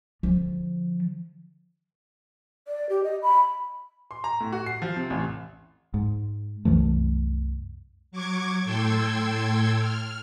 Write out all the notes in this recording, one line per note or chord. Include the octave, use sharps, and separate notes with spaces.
D3 F3
D5
G4
D#5
B5
C6
A#5
A2
F#4
C7
F3
C3
A1
G#2
C2 F#2 E3 A3
F#3 C#6 D6 G#6
A2 A4 G5 C6 E6 G#6
F6